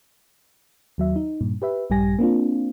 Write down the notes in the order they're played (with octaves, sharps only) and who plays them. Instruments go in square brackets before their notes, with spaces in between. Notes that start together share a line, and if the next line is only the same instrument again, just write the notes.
[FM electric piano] D#2 F#3 E5
D#4
G2 A#2
G4 B4 E5
A#1 G2 G3 G4 G#5 A#6
A#3 C4 D4 F4